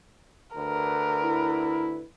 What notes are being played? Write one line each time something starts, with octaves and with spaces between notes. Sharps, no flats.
D2 D3 A#4 B4
E4